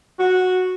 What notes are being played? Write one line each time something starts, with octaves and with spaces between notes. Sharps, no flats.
F#4